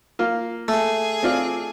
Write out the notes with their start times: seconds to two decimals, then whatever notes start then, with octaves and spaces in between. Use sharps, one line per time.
0.19 A#3 F4
0.68 A3 G#4
1.23 C4 F4 D5